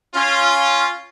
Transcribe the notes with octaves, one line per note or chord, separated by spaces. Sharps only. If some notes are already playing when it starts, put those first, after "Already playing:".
C#4 F4